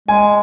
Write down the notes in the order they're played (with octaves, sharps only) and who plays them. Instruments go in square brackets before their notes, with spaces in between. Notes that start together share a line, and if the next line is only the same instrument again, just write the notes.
[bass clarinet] G#3 [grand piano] G#5